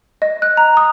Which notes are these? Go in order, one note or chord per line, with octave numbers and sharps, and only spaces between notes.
D#5
F#6
A#5
D#6